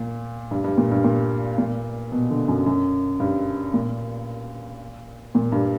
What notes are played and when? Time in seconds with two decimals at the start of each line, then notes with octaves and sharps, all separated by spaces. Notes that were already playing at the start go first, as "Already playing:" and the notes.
Already playing: A#2
0.51 G2
0.64 G2
0.77 A#2
0.91 G2
1.04 A#2
1.58 A#2
2.12 B2
2.30 D3
2.48 F#2
2.66 F#2
3.20 G2
3.74 A#2
5.35 A#2
5.52 G2